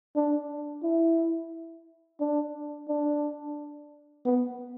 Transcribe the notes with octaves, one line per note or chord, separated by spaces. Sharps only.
D4
E4
D4
D4
B3